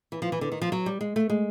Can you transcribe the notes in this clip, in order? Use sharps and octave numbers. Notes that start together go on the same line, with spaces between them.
E3
F3
E3
D3
D#3
F3
F#3
G3
G#3
A3
G#3